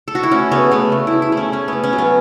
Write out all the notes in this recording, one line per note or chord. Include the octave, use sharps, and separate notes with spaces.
A4
F#4
E4
A3 C#4
C#3 B3
A3 B3
C#3
E4
C#3
E4
A3
C#4
A3 C#4
A3 B3
C#4
F#3
B3